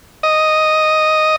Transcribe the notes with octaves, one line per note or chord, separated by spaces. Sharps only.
D#5